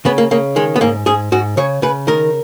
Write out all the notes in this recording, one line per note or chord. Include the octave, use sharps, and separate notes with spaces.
C#3 B3
A#3
C#3 A#3
D#3 G#3
B3
G#2 A#3
G#2 G#4
G#2 F#4
C#3 C#5
C#3 B4
D#3 A#4